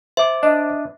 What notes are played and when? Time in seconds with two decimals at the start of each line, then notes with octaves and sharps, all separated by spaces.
0.17 C5 E5 D6
0.43 D4 D#5